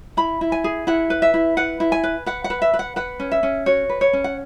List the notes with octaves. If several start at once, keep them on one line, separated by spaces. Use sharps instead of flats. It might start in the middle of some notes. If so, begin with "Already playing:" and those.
E4 B5
E4
G#5
G#4
E4 F#5
B4
E5
E4
B4 F#5
E4
G#5
B4
B4 F#5
F#5
B4
E5
B4
F#5
B4 F#5
C#4
E5
C#4
F#4 C#5
B4
C#5
C#4
F#5